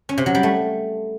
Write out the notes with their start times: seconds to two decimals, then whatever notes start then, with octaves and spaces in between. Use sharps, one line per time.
0.09 C#4
0.18 C3
0.26 F#3
0.35 G3
0.43 A3